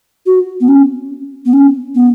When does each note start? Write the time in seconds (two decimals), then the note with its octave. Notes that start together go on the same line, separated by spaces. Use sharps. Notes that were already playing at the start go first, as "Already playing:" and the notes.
0.26 F#4
0.61 B3
0.68 C#4
1.46 B3
1.53 C#4
1.95 B3